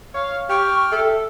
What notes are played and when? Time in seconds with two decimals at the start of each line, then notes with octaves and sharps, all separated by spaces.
0.15 C#5 F5
0.49 G4 G5 C#6 F6
0.91 A4 E5